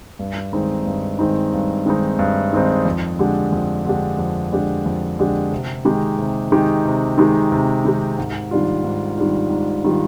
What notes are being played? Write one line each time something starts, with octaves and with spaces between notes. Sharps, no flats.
G2
D#3 G#3 C4 D#4
G2
D#3 G#3 C4 D#4
G2
D#3 G#3 C4 D#4
G2
D#3 G#3 C4 D#4
F2
D3 G#3 D4 G4
F2
D3 G#3 D4 G4
F2
D3 G#3 D4 G4
F2
D3 G#3 D4 G4
C3
D#3 G#3 D#4 G4
C3
D#3 G#3 D#4 G4
C3
D#3 G#3 D#4 G4
C3
D#3 G#3 D#4 G4
G#2
D#3 G3 D4 F4
G#2
D#3 G3 D4 F4
G#2
D#3 G3 D4 F4